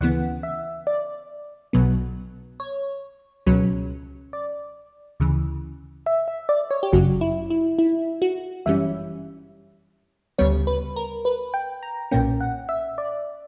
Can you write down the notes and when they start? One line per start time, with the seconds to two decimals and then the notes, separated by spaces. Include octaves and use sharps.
0.01 D2 C#3 E3 B3 F#5
0.43 E5
0.87 D5
1.73 B1 B2 F#3 B3
2.60 C#5
3.47 C#2 B2 F#3 C#4
4.33 D5
5.20 D2 C#3 E3
6.06 E5
6.28 E5
6.49 D5
6.71 C#5
6.83 G4
6.92 G1 F#2 C#3 F#3 F#4
7.21 E4
7.50 E4
7.79 E4
8.22 F#4
8.66 G1 F#2 E3 G3 C#4 E5
10.38 D2 C#3 G3 B3 C#5
10.67 B4
10.96 A#4
11.25 B4
11.54 G5
11.83 A#5
12.11 B1 A#2 A#3 C#4 G5
12.41 F#5
12.69 E5
12.98 D5